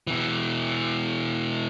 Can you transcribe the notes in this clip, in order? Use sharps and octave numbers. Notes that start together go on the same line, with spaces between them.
B2 E3